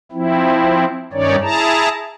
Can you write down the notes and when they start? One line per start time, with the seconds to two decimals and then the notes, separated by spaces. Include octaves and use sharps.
0.12 F3 C4 E4
1.13 G2 D#3 C#4 D#4 C#5 D5
1.42 E4 G#4 A5 A#5